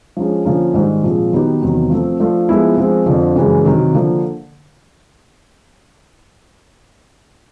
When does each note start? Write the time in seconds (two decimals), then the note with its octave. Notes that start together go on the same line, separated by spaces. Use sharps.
0.17 F3 G#3 C#4
0.45 D3 F3 A#3 C#4
0.74 G#2 D#3 G3
1.03 A#2 F3 G#3 C4
1.33 D#3 F#3 B3 D#4 G4
1.62 E2 C3 D#3 F#3
1.90 F3 A3 C4
2.20 F3 A3 D4 F4
2.49 F3 G#3 B3 E4
2.78 F3 G#3 C4
3.06 F2 D3 F3
3.36 F#2 C#3 E3 G#3
3.65 C3 D#3 F#3
3.93 D3 F3 A#3